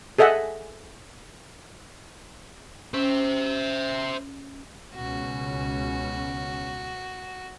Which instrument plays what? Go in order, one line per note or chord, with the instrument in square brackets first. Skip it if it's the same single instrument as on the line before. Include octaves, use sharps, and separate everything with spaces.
[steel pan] G#4 A4 D#5 E5 F#5
[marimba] C#4 [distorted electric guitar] C5 E5
[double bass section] C#2 B2 C#4 [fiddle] F#4